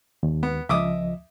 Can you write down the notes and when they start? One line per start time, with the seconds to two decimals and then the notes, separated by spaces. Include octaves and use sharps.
0.23 D#2
0.43 B3
0.69 C#2 F3 D#5 E5 D6 D#6